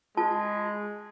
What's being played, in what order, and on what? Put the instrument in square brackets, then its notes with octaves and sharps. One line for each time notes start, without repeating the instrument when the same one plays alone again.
[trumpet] G#3 [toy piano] F4 A5